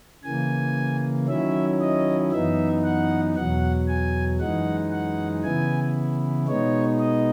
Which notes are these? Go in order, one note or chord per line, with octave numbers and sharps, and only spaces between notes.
C#3 E3 A#3 G#5
D#3 F#3 C#4 E4 E5
D#5
F#2 E3 B3 D#4 E5
F#5
E2 B2 F#3 F#5
G#5
F#2 E3 G#3 D#4 F#5
F#5
C#3 E3 B3 E4 G#5
B2 G#3 B3 D#4 C#5
D#5